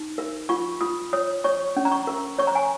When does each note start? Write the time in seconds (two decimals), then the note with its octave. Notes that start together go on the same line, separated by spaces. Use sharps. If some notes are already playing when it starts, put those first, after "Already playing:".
Already playing: D#4
0.18 A#4
0.49 F4 C#6
0.81 F4 D#6
1.13 C#5 D#6
1.44 C#5 C#6
1.76 C#4
1.85 A#5
1.92 C#6
2.07 A#4
2.39 C#5 C#6
2.47 A#5
2.55 G#5